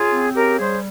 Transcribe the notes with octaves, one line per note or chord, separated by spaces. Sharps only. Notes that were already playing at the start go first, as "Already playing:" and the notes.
Already playing: C#3 F4 G#4
C4
C#3 G4 A#4
G3 G#4 C5